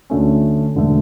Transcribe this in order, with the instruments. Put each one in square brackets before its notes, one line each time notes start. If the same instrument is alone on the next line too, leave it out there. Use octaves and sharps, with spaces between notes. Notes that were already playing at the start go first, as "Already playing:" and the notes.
[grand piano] D2 D3 A3 C#4
E1 D3 A3